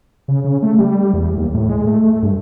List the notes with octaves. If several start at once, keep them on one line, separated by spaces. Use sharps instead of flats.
C#3
C#3
A3
G3
E2
D#2
A2
G#3
A3
G2